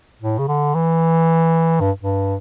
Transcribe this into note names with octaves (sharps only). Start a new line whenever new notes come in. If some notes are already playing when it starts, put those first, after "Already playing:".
A2
C#3
D3
E3
G2
G2